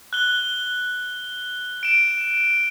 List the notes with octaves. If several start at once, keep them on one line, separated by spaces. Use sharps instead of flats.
F#6 G7
D7 E7